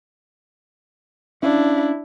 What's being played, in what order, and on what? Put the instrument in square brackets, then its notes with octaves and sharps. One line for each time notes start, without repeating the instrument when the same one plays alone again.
[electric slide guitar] C#4 F5 [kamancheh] D4 E4